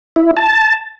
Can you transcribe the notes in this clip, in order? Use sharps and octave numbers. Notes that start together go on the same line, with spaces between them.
E4
A5